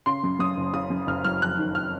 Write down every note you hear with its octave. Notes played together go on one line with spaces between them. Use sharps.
C#3 C6
F#2
F#2 D#6
F#1
C#3 D#6
F#2
F#1 F6
F#3 F6
F2 F#6
D#3
F6